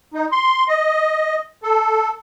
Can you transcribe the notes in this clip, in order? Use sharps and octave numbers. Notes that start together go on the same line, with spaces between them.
D#4
C6
D#5
A4